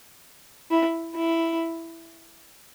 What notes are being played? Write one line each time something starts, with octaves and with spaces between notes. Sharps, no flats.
E4
E4